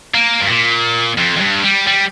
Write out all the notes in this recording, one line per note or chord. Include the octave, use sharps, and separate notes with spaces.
A#3
G2
A#2
F2
F2
G2
G3
G3